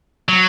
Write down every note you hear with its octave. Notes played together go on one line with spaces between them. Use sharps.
F#3